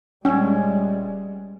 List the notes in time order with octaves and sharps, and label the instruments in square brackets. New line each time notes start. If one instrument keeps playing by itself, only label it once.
[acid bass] D#1 [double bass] G3 G#3 [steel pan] C#4